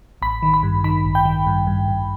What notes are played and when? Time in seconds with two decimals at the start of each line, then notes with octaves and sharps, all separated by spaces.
0.22 A1 B5
0.43 D#3
0.54 B5
0.63 G2
0.84 D#3 B5
1.05 A1
1.15 G5
1.25 D#3
1.47 G2
1.67 G2
1.88 G2